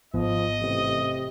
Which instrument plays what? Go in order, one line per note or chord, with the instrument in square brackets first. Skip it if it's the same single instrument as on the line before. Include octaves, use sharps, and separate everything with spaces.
[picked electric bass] G#1 B3 [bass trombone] F3 [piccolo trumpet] D#5
[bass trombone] A1 [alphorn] C3